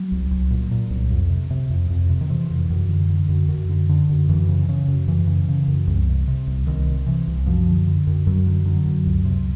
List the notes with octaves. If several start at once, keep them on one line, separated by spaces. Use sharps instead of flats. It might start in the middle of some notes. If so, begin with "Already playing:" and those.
Already playing: F#3
C2
C2
A#2
A#2
C2
F2
C3
C3
F2
F2
C3
D#3
C3 E3
F2
F#2
D3
D3
F#2
F#2
D3
D3
F#2
F#2 E3
C#3
C#3
F#2
F#2 E3
C#3
C#3
F#2
C2
C3
C3
C2
C2 D#3
C3
C3 E3
C2
F#2 F3
D3
D3
F#2
F#2 F#3
D3
D3 F#3
F#2
C#2
C3